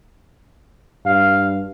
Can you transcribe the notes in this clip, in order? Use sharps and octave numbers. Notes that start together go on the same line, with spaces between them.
G2 F5